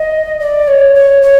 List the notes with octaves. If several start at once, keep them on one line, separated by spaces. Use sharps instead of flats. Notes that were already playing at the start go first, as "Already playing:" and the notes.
Already playing: D#5
D5
C#5
C#5
C#5